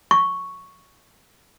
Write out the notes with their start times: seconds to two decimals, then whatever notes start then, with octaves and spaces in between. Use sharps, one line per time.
0.11 C#6